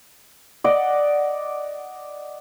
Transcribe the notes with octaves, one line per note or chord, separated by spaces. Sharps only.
D5 D#5 F#5